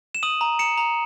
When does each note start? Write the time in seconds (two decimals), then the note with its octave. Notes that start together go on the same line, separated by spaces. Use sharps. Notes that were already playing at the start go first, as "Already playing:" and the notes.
0.15 E7
0.23 D#6 D#7 F#7
0.41 A#5
0.59 A#5 C#7 E7
0.77 A#5